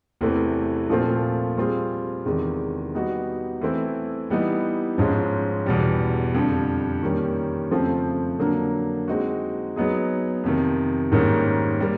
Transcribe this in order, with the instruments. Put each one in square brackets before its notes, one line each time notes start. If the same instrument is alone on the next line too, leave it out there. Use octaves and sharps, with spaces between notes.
[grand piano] E2 C3 E3 A3 C4
A#2 F3 A3 C4 F4
G3 C4 F4 G#4
E2 C3 D#3 G#3
G3 B3 D#4 F#4
E3 A3 C4 E4
E3 G3 B3 D#4
G#2 F3 G#3 C#4
E2 B2 G3
F2 D3 G3
D#3 G3 A#3 C#4
F2 C#3 F3 A3 C4
D3 F#3 A#3
G#3 C4 D#4 F#4
F#3 B3 D#4 G#4
F2 C3 D#3
G#2 D#3 G3 A#3 C#4
G3 A#3